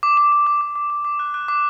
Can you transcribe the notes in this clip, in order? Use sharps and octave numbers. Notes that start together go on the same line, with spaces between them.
D6
D6
D6
D6
D6
D6
D6
D6
F#6
F#6
D6